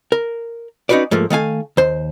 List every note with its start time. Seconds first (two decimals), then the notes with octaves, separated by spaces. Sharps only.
0.12 A#4
0.89 C#4 D#4 F4 F#4 B4 D5
1.11 G#2 F3 A3 A#3
1.30 D#3 A3 F5 G#5
1.77 D#2 C5